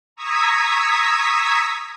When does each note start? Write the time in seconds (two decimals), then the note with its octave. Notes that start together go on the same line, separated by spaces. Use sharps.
0.16 A#5 C#6 D#6 E6 G#6 B6